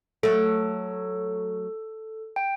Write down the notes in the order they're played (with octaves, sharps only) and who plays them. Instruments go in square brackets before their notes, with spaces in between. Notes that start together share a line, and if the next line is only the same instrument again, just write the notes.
[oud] F#3 A3 [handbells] A4
[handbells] G5